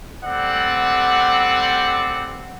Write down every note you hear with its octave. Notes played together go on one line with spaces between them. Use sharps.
G3 A3 C4 D5 F#5